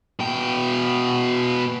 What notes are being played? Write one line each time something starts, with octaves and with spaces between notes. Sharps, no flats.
B2 G5